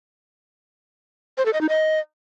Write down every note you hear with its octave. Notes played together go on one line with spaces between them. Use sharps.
C5
A4
D#5
D#4
D#5